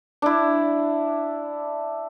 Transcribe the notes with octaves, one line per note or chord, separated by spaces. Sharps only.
D4 E4